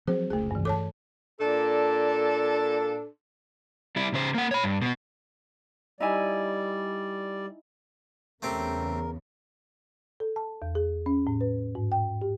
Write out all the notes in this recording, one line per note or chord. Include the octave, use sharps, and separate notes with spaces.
F3 F#3 C4 G#4 C5
F1 C#2 A3 G#4
G2 E3
A4 C#5 A5 D6
A#2 D4 A4
G3 E4
C#3 C5
A#3 F#5
C#5 B5
G2
B2 B3
G3 D#4 E4 D5 G#5
E2 C#3 A3 C4 G4 A#4
A4
A5
E2
G#4
C#4
A2
B4
G#2
G5
G4